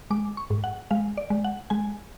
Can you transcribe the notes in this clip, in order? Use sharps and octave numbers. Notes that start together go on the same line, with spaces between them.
G#3 D6
C#6
G#2
F#5
G#3 F5
D5
G#3
F#5
G#3 G#5